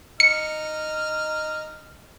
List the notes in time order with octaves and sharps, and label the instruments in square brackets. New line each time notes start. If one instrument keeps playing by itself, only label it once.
[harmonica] D#4 F6 [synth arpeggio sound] C#7